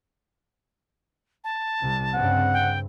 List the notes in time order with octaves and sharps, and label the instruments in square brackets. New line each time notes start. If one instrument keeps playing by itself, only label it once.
[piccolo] A5
[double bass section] C2 C3
[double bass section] G2 C#3 C4 [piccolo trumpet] F#5
[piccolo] G5